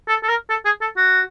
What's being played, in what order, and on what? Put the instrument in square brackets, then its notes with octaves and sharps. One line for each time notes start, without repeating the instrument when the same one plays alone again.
[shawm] A4
A4
A#4
A4
G#4
A4
F#4